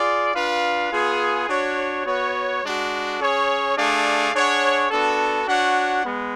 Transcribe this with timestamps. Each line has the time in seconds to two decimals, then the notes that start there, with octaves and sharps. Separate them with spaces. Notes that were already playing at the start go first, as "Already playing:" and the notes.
Already playing: F4 G#4 D5
0.35 D4 F4 B4 F5
0.92 B3 F4 G#4
1.49 D4 F#4 C#5
2.05 B3 F#4 C#5
2.63 G#3 D4 F#4
3.19 C#4 G#4 C#5
3.76 A3 D4 G#4 D5 F5
4.33 D4 G#4 C#5 F#5
4.90 B3 D4 F#4 A4
5.47 D4 F#4 C#5 F#5
6.04 G#3 B3